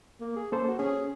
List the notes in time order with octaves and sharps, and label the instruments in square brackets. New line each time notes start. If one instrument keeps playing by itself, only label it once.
[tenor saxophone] A#3
G#4
[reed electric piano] A#3 A4 C5 [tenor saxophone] C#4
[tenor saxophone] F#4
[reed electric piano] C#4 [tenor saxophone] G#4